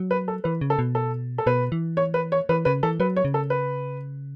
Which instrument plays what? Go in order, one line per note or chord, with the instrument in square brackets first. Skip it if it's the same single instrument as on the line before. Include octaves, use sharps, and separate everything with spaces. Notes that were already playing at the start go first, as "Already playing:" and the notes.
Already playing: [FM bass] F#3
[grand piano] B4
A4
[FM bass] E3 [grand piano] B4
[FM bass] C#3
[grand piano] A4
[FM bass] B2
[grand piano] A4
A4
[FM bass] B2 [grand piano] B4
[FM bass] E3
[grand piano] C#5
B4
C#5
[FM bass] E3 [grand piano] B4
[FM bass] C#3 [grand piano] B4
[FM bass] E3 [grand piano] A4
[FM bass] F#3 [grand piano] B4
[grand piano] C#5
[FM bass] C#3
[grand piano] A4
B4